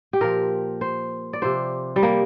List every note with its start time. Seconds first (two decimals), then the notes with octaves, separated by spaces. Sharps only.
0.13 G4
0.21 A#2 F3 A#4
0.81 C5
1.33 D5
1.42 C3 F3 C5
1.96 G3
2.03 A#3